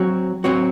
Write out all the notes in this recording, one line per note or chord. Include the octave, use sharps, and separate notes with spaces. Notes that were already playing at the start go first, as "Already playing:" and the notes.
Already playing: F#3 C4 F#4 C#5
F#3 C4 F#4 C#5